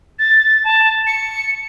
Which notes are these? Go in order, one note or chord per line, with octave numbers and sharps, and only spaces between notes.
A6
A5
C#7